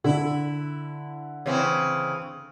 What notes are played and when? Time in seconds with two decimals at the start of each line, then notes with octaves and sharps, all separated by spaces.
0.04 D3 E4
1.46 C#3 E3 C4